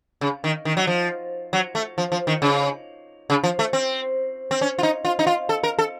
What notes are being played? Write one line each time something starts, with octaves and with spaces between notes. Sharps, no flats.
C#3
D#3
D#3
F#3
F3
F#3
A3
F3
F3
D#3
C#3
C#3
F3
A3
C4
C4
C#4
F4
D#4
F4
D#4
F4
A4
A#4
A4